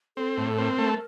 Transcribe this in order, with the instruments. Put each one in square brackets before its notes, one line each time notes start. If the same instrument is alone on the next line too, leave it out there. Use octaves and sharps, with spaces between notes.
[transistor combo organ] C4 [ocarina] A4
[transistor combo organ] A2
[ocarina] A4
[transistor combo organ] C4 [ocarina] A#4
[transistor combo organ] A3